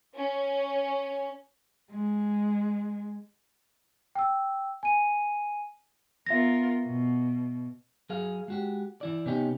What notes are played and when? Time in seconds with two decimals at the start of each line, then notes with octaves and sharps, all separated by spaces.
0.15 C#4
1.91 G#3
4.15 G5 E6
4.83 G#5 D#7
6.26 B3 F4 A#4 E5 A#6
6.85 B2
8.10 F#3 G#4 F5
8.48 G#3 F#4 G4
9.01 E3 E4 D5
9.26 C3 B3 C#4 D#4 G4